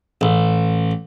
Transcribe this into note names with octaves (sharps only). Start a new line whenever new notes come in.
A1